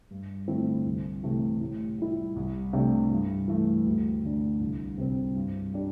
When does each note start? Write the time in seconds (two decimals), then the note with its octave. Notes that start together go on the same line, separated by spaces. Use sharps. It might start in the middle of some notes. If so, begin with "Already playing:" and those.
0.11 G2
0.48 D3 A3 C4 E4
0.86 C2
1.23 C3 E3 A3
1.61 A2
1.98 G3 E4
2.36 C2
2.73 C3 A3 D4
3.10 G2
3.48 E3 A3
3.85 D2
4.23 D3 A3 D4
4.60 C2
4.98 C3 G3 C4
5.35 G2
5.74 G3 D4